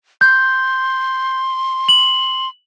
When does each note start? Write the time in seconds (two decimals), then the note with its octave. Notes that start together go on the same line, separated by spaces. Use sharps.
0.21 C6 G6
1.88 F#7